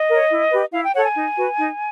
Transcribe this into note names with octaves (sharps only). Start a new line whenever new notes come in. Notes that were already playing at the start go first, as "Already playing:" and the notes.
Already playing: D#5
A#4
C#5
E4
G4 B4
E4 F5
G5
A4 C#5 F#5
G#5
D#4
F#4 B4
D#4